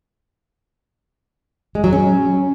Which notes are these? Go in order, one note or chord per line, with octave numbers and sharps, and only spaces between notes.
G#3
F#3
C#4